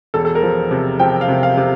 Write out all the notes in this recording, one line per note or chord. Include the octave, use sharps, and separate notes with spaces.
E1 A4
A4
A#4
F3
C3
F3 G5
F5
C3
F5
C3